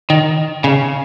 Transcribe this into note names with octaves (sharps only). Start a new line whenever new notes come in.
D#3
C#3